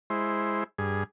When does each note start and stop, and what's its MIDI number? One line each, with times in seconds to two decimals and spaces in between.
0.10 0.64 56
0.10 0.64 64
0.10 0.64 72
0.78 1.04 43
0.78 1.04 68